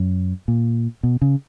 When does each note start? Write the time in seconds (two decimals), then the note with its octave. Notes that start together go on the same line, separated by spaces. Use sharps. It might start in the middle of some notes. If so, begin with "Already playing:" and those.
Already playing: F#2
0.48 A#2
1.03 B2
1.22 C#3